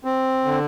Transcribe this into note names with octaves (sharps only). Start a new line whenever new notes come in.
C4
D3